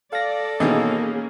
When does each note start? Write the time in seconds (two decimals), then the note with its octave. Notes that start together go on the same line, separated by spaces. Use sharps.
0.13 A4 D5 F5 A#6
0.60 B2 D#3 E3 A#3 C#4 G#4 D#5